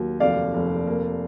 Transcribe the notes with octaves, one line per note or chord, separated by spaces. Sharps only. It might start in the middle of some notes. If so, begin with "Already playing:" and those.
Already playing: D#2 F#3
F1 D5 F5
F1
A#3